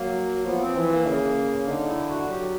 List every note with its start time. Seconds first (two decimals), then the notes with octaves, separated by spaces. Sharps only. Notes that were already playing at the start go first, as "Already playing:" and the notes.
Already playing: F#3 A#3
0.45 F3 B3
0.61 C4
0.76 E3
0.91 A#3
1.07 C#3
1.68 D3 D#4
1.88 E4
2.09 F#4
2.28 F#3 G4